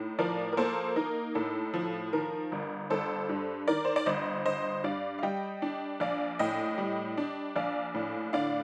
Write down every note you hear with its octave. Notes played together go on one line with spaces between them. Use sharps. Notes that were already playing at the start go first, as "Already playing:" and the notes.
Already playing: A2 D#4
F3 A#4 D5
A#4
A#3 A4 C5
D#4 A#4
A2 A4
F3
D#3 A#4
G1
G1 A4 C5
G2
D#3 A#4 D5
C5
D5
G1 C5 D#5
G1 C5 D#5
G2 D5 F5
F5
G3 D#5 G5
D4
A#1 D5 F5
A2 D#5 G5
G3
D4
A#1 D5 F5
A2
D3 D5 F5